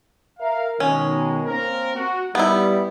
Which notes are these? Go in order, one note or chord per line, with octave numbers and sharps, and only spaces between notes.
A#4 E5 F5
B2 D#3 G#3 C#4
A#3 C4 A#4
F#4
G3 B3 E4